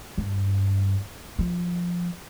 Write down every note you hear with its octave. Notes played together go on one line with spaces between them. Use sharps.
G2
F3